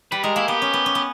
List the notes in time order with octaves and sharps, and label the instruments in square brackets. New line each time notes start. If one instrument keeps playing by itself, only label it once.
[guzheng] G3 [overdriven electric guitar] B4
[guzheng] G#3 [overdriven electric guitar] A#4
[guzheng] A#3 [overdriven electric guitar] E4
[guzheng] B3 [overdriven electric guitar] G4
[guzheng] C#4
B3
C#4
B3